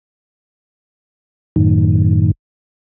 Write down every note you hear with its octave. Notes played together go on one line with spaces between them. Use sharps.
F#2 A2 D#3